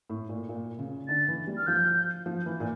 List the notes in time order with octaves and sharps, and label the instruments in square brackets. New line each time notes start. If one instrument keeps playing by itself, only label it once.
[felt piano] A2
A#2
A#2
C#3
[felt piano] D3 [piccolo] A6
[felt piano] E3
G3
[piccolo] F6
[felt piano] F3 [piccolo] G6
[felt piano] F3
E3
A#2